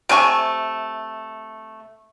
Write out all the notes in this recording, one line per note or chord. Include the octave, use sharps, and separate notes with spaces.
C3 A3 G#5 C#6